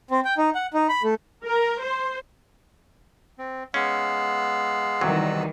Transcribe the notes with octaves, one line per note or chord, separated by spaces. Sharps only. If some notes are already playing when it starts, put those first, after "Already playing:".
C4
G5
D#4
F#5
D#4
B5
A3
A#4
C5
C4
G#3 B3 C#4 F5 E6 F#6
D2 C3 D#3 E3 F#3 G3